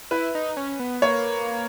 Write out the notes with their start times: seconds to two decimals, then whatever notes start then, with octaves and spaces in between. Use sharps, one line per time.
0.11 E4 B4
0.35 D#4
0.57 C#4
0.79 B3
1.02 A#3 C#5